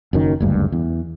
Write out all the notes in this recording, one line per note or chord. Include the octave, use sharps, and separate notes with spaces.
F#1 F#2 D#3
F#1 D2 G2
E2